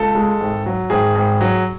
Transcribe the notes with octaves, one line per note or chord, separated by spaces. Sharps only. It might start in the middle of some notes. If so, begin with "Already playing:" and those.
Already playing: C#2 A4
G#3
G#1
F#3
G#1 G#4
G#1
F#3